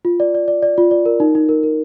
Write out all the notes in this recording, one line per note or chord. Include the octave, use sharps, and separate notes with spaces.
F4
D5
D5
D5
D5
F4
D5
A#4
D#4
D#4
A#4
A#4